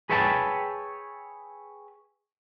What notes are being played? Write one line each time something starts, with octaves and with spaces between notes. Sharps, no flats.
G#4 B4 C#5 E5 G5 A5